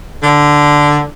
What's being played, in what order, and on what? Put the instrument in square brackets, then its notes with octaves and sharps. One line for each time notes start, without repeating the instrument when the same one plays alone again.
[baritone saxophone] D3